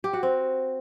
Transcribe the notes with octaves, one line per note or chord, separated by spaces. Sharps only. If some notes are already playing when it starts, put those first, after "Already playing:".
G4
F#4
C4